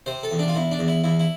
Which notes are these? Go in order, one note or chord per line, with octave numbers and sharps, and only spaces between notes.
C3 C5
A4
E2
D4
F4
E2 E4
D4
E2
E4
E2 E4
E4